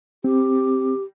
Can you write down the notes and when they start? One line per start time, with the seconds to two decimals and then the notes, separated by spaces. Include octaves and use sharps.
0.24 C4 G4